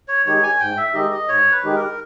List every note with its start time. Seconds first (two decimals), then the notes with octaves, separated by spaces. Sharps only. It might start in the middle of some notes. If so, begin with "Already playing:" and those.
0.08 C#5
0.26 D#3 G#3 D#4 G4 C#5
0.43 G#5
0.60 G#2 G5
0.77 E5
0.94 D#3 G#3 D#4 G4 D#5
1.12 D#5
1.29 G#2 C#5
1.52 B4
1.64 D#3 G#3 D#4 G4
1.76 A#4